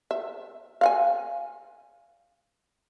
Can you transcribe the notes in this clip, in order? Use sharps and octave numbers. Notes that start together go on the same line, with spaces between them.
E5
F5 F#5 G#5